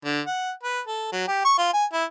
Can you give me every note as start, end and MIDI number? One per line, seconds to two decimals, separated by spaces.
0.05 0.21 50
0.27 0.51 78
0.63 0.80 71
0.87 1.07 69
1.12 1.27 54
1.28 1.40 67
1.45 1.53 85
1.58 1.68 65
1.73 1.85 80
1.93 2.04 64